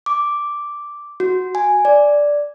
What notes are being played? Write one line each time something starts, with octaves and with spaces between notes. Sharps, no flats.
D6
F#4
G#5
D5